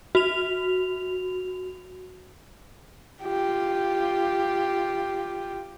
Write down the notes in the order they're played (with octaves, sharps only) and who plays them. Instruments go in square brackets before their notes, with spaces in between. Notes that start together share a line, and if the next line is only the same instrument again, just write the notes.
[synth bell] F#4 F7
[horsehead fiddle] F4 G4